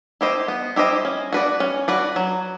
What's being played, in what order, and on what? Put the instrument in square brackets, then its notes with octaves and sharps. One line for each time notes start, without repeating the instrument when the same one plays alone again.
[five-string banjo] E4 G4 C5 D#5
B3
E4 G4 C5 D#5
C#4
F#4 B4 D5
C#4
F#4 B4 D5
F#3